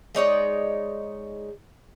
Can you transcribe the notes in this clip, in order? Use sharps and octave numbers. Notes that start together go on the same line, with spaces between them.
G#3 D#4 C#5 D5